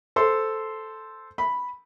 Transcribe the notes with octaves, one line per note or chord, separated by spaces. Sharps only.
A4 C5 C6
B5